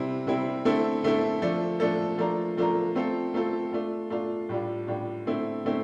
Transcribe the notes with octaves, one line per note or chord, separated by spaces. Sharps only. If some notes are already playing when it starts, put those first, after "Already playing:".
Already playing: C3 G3 C4 E4
C3 G3 C4 E4
D3 A3 C4 E4 A4
D3 A3 C4 E4 A4
F3 A3 D4 A4
F3 A3 D4 A4
F3 A3 D4 F4 A#4
F3 A3 D4 F4 A#4
A3 C4 F4 A4
A3 C4 F4 A4
A3 D4 F4
A3 D4 F4
A2 G3 D4 F4
A2 G3 D4 F4
D3 A3 C4 E4
D3 A3 C4 E4